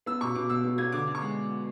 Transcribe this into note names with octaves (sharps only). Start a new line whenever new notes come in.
B3 E6
B2 C#6
B2 D6
B2 E6
B2
B3 G#6
D3 D6
D3
C#6
G#3